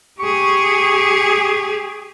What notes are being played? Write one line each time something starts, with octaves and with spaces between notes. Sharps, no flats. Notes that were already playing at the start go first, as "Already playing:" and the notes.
G4 G#4 C#6